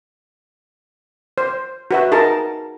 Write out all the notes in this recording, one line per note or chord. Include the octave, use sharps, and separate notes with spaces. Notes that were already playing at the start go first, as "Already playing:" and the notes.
C5
F#4 B4 E5
D#4 G#4 A#4 A5